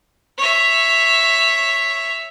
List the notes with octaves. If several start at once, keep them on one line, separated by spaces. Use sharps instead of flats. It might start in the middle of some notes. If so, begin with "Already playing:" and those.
C#5 E5